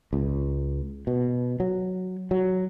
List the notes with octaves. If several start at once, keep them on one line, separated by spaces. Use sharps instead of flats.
C#2
B2
F#3
F#3